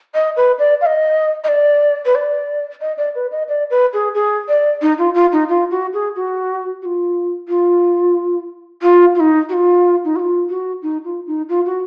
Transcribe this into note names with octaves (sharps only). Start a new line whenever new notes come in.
D#5
B4
D5
F5
D#5
D#5
D5
B4
D5
D#5
D5
B4
D#5
D5
B4
G#4
G#4
D5
D#4
F4
F4
D#4
F4
F#4
G#4
F#4
F#4
F4
F4
F4
F4
D#4
F#4
F4
D#4
F#4
F4
F#4
D#4
F4
D#4
F4
F#4